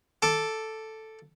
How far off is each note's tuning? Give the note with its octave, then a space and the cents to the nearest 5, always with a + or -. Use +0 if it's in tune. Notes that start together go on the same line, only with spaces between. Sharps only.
A4 +0 D6 +0